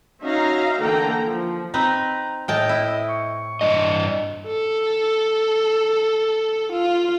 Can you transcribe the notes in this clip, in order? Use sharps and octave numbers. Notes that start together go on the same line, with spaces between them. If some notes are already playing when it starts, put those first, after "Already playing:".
C#4 D#4 F#4 E5 F5 A#5
D3 E3 A#3 A4 G5 A#5
F3
C4 D#4 B4 A#5
A2 D#5 G5 A5
E4
C#6
G2 D4 D#5
A4
F4